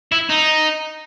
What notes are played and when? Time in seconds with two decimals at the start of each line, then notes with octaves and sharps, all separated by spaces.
0.12 E4
0.29 D#4